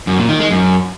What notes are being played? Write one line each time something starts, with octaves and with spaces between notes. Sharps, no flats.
F#2
A#2
D#3
G#3
F#2